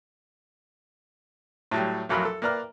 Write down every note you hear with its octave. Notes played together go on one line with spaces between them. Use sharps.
A2 F#3 G3
A1 F2 F#3 A#4 B5
A4
A#3 B4 D5 A#5 F6